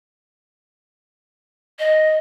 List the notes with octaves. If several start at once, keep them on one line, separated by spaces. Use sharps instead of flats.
D#5